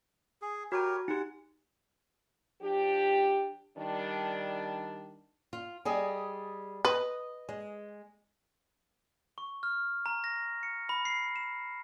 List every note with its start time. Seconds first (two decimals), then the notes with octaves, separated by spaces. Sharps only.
0.42 G#4
0.72 F#4 G4 A#4 C#5 A#5
1.08 D#4 G4 F#5
2.62 F3 D4 G4
3.77 D#3 G3 D4
5.53 F4
5.85 G3 G#4 D#5
6.85 B4 D#5
7.49 G#3
9.38 C#6
9.63 F6
10.06 A#5
10.24 A#6
10.63 C#7
10.89 B5
11.05 C7
11.36 E7